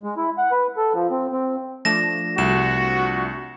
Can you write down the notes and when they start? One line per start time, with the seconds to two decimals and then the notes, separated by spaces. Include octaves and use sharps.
0.03 G#3
0.17 E4
0.38 F#5
0.52 B4
0.77 A4
0.94 F3
1.11 C4
1.32 C4
1.85 F3 A3 D4 A#6 E7
2.38 C2 F#4 E7